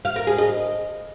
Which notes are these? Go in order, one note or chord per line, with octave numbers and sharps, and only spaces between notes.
F5
A#4
G#4
D#5